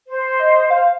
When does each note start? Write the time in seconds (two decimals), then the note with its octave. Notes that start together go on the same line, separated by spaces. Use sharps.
0.08 C5
0.39 D#5
0.70 F5